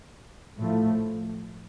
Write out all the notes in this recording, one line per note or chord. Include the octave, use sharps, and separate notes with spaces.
A2 F3 A3